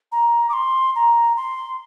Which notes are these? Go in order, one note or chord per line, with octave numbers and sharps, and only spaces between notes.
A#5
D6
C6
A#5
C6